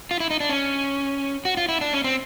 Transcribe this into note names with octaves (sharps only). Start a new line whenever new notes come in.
F4
E4
D#4
D4
C#4
F#4
F4
E4
D4
C#4
C4